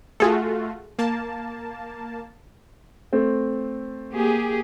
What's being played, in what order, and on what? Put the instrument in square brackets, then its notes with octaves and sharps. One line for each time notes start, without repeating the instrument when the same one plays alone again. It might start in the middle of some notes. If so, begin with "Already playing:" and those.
[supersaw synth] A3 F4 F#4 [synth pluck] G#4 A4
[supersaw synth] A#3 A5
[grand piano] A3 C4
[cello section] A#3 G4 G#4